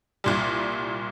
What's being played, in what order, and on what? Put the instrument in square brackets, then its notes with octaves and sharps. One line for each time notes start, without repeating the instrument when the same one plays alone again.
[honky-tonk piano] C2 A#2 G3